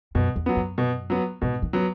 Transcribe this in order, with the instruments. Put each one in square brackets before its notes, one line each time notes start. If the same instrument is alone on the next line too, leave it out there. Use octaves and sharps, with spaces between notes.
[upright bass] F#2 [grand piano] B2
[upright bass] E2
[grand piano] F#3 B3
[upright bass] F#2
[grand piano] B2
F#3 B3
[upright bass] G#2 [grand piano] B2
[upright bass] D#3
[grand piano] F#3 B3